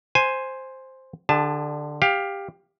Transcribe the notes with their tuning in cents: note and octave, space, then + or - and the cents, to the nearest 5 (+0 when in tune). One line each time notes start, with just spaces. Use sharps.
C5 +0 G#5 +0
D3 +15 G#4 -45 A5 +0
G4 +15 F5 +15